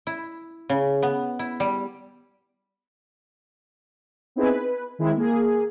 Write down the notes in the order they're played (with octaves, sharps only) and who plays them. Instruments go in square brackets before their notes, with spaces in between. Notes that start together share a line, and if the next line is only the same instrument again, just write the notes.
[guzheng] E4
C#3
B3
E4
G3
[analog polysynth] B3 C4 D#4 E4 G#4 B4
B4
D#3 G#3 C4 E4
A#3 G#4